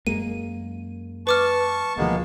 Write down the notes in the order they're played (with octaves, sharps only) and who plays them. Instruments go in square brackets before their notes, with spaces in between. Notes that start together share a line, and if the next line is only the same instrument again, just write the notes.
[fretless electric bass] F#2 G#3 A#3 [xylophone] D#7
[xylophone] B4 D6 F6 [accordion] A5 C#6
[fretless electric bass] E1 D2 F3 [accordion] G#3 A#3 B3